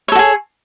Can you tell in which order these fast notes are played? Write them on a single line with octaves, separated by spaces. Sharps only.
C#5 A4 F#4 G#4